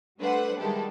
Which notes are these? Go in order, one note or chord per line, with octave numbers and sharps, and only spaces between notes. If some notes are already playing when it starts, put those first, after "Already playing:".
G3 A3 D4 B4 C5 F#5
D#3 G3 G#3 E4 G4 A4